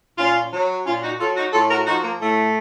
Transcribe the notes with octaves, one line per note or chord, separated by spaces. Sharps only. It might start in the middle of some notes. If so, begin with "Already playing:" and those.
A#2 C#4 F4
F#3
A#2 C#4 F4
D#4 F#4
F#3 F4 A4
D#4 F#4
A2 F4 A4
F#4 A#4
F3 D#4 F#4
A#3
A2 A3